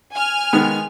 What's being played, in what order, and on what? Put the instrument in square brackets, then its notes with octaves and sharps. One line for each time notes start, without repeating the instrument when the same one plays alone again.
[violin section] G#5 F6
[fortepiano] D#3 G#3 B3